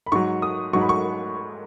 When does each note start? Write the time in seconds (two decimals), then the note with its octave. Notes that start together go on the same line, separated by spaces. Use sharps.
0.06 B5
0.12 G#2 F#3 C#6
0.42 D#6
0.73 G#2 F#3 C#6
0.81 B5
0.89 C#6